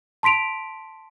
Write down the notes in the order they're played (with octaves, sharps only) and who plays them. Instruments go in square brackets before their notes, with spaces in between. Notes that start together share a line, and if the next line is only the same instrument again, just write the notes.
[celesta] A5 C6 B6 D7 F7